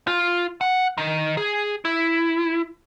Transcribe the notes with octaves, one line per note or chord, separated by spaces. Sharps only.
F4
F#5
D#3
G#4
E4